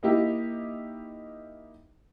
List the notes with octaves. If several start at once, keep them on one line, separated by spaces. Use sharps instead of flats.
A#3 D#4 E4 G4